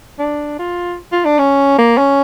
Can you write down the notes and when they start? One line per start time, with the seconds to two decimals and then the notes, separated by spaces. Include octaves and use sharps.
0.19 D4
0.59 F4
1.12 F4
1.25 D4
1.38 C#4
1.78 A#3
1.98 C#4